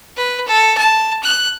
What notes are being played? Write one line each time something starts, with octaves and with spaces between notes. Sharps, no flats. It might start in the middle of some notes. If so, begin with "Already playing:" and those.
B4
A4
A5
F#6